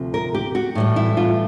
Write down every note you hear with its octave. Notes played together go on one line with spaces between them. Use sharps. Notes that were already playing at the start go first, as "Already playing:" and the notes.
Already playing: D2 C3 F3
A#4
G4
F#4
A2 E3 G3
E4
F4